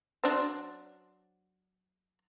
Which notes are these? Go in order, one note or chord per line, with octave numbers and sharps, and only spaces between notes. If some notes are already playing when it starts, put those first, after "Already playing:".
F#3 D4 C5